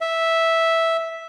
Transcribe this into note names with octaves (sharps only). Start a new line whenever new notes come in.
E5